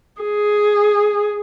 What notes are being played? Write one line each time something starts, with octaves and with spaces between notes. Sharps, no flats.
G#4